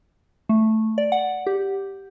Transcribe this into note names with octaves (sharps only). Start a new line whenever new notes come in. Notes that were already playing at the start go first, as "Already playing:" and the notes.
A3
D5
F#5
G4